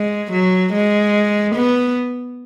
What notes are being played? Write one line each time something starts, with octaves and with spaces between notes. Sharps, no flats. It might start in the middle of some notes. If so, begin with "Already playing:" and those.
Already playing: G#3
F#3
G#3
B3